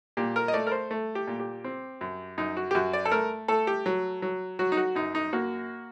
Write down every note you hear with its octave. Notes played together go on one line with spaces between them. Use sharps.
A#2 G4
A#4
D#5
A3 D5
A#4
C5
A3
G4
A#2
G4
C4
F#2
F#2 D#4
F#4
G4
F#2 F#4
D5
A4
A3 A#4
A3 A4
G4
F#3
F#3
F#3 F#4
D#4
F#4
F#2 D#4
D#4
A#3 F#4